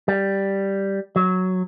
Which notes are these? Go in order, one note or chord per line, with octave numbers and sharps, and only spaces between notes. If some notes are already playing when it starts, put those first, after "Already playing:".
G3
F#3